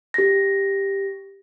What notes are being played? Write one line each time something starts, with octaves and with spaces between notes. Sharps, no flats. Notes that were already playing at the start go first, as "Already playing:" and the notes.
G4 A#6